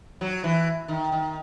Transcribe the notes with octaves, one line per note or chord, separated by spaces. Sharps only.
F#3
E3
D#3
D#3